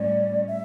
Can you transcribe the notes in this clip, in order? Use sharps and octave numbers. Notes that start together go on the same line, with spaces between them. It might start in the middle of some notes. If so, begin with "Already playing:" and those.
Already playing: A2 G3 C#4 D5
E5